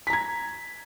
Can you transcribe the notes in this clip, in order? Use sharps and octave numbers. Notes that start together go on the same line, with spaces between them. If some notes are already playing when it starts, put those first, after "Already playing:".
A#5 G#6 B6